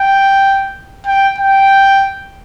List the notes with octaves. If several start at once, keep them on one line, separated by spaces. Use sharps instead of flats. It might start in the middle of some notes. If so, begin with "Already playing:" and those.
Already playing: G5
G5
G5